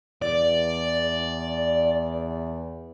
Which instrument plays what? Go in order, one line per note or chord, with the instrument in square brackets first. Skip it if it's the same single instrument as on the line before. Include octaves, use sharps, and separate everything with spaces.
[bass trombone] E2 [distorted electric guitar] D5